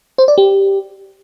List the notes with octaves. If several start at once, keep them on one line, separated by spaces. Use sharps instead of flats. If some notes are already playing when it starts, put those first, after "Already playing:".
C5
D5
G4